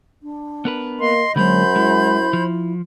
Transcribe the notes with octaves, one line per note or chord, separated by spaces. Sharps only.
D4
B3 A#4 B4
A#3 D#5 C6
F#2 D3 F#3 G#3 A#3 C5 B5 G6
G#3 E4
F3